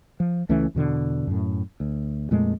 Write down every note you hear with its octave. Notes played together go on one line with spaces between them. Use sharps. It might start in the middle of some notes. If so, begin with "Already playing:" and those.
F3
C#2 E3 A3 C#4
E2 B2 D3
F#2 A2
D2
F2 A#2 G#3 A3